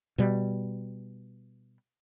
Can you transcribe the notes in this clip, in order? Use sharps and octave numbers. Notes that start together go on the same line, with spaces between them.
B2 G3